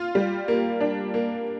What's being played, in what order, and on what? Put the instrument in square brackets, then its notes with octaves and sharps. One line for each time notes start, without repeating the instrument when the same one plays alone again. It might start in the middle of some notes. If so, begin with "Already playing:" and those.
Already playing: [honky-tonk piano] F4
G3
A#3
D4
A#3